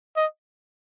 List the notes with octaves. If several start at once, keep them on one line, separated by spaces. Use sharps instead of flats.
D#5